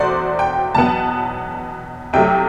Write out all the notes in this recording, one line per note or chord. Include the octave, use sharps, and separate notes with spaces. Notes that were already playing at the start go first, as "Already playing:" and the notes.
Already playing: E2 B2 A3 F#4 C5 D5
G5
E2 B2 F#3 B3 A5
C2 C3 F#3 A3 G5